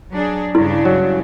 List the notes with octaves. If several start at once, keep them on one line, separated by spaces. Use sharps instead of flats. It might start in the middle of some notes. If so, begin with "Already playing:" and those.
F#3 D4 G#4
G2 C#3 D4 E4
F#3